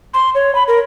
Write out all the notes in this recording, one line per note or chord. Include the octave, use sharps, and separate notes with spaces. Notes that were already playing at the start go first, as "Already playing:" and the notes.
C6
C#5
B5
A#4